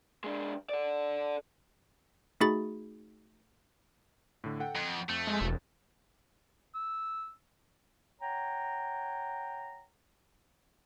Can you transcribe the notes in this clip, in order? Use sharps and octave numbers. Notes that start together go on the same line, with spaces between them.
G#3 D4
A4 D5
A3 D#4 F#4 G#4 B5 A6
A2 D3
A4 F#5 G5
F2
F2 A3
G#3
E1
E6
C#5 F#5 G5 A#5